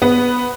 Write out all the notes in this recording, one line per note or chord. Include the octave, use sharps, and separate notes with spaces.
B3